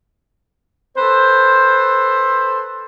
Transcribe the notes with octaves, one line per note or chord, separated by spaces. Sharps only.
A4 B4 C5